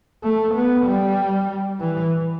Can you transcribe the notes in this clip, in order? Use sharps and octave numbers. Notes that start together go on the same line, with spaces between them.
A3
B3
G3
E3